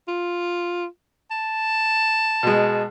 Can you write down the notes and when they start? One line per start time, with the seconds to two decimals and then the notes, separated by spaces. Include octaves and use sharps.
0.08 F4
1.31 A5
2.43 B2 G#3